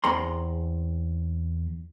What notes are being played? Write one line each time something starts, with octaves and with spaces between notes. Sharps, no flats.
E2 C4 G#4 A#5 C6